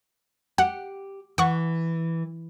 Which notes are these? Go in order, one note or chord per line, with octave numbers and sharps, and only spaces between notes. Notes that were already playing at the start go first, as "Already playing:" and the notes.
G4 F#5
E3 F#5 C#6